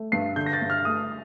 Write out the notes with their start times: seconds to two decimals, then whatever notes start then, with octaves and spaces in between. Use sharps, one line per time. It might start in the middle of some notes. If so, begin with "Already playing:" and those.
Already playing: A3
0.12 G2 C7
0.36 D3 G6
0.46 A#6
0.53 A6
0.62 G2
0.70 F6
0.85 A3 D#6